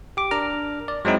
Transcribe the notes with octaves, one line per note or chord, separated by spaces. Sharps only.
G4 D6
D4 A#4 A#5 F6
D5
F#3 G#3 C4 D#4 E4